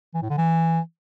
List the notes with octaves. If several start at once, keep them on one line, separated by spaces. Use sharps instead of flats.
E3
A2
D3
E3